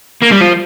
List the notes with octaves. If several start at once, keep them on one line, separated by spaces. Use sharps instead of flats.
A#3
G3
F3